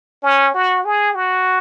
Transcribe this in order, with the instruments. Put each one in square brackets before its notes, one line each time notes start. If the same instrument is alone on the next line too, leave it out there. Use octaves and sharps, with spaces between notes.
[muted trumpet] C#4
F#4
G#4
F#4